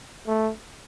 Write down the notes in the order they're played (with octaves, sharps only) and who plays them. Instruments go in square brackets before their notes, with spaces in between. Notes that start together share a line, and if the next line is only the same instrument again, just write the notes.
[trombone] A3